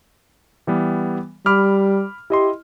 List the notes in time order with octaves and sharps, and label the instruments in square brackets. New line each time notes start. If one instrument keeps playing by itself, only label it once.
[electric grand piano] E3 G3 B3
[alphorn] G3 [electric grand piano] B5 D6 F6
[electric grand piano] E4 D#5 C6 [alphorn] G4